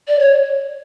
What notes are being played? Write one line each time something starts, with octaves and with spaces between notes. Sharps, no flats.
D5
C#5